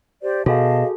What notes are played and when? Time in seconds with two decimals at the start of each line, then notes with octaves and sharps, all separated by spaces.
0.21 G4 C5 D5
0.46 B2 F#4 G#4 A4 D#5 F5 A5